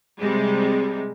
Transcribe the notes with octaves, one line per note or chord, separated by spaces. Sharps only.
C3 G3 G#3